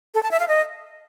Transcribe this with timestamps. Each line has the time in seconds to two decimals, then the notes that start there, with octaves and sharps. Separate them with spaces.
0.15 A4
0.23 A5
0.31 E5
0.40 F5
0.48 D#5